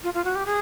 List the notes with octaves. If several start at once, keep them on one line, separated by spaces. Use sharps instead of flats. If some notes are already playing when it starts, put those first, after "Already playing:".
F4
F4
F#4
G4
G#4